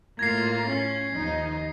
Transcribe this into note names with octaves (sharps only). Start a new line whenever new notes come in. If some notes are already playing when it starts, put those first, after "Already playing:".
A2 A#3 F4 G#6 A#6 C7
C#4
D#2 F3 D#4